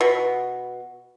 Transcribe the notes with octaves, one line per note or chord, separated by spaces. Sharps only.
B2